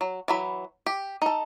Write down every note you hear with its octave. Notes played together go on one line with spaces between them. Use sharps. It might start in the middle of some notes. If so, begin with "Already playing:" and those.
F#3
E3 F#3 B5
G4
D#4 A4